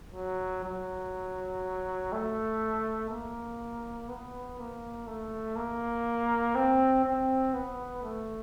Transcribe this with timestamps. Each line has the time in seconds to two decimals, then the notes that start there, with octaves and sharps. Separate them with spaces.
0.15 F#3
0.64 F#3
2.12 A3
3.10 A#3
4.09 B3
4.58 A#3
5.07 A3
5.56 A#3
6.55 C4
7.05 C4
7.54 B3
8.03 A3